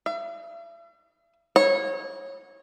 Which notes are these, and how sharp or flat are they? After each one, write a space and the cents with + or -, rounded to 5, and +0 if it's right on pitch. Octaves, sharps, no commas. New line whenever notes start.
E5 +45
C#5 -25